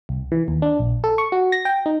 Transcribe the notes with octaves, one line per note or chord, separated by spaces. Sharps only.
C2
E3
D#2
D4
A#1
A4
C#6
F#4
A#6
G5
D#4